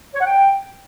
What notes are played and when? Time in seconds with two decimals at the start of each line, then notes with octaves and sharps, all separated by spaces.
0.15 C#5
0.21 F#5
0.27 G5